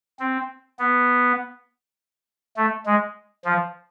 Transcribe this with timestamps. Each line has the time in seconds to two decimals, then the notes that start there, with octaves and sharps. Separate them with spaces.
0.19 C4
0.79 B3
2.57 A3
2.86 G#3
3.45 F3